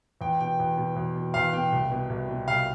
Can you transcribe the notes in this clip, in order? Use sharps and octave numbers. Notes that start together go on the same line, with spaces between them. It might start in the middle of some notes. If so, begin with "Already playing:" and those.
E2 G5
B2 G5
E2
B2
E2
B2
E2 F5
B2 G5
C2
B2
C2
B2
C2 F5